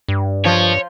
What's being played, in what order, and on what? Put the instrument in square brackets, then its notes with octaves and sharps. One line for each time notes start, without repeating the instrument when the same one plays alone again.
[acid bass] G2
[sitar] F3 [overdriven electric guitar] C#5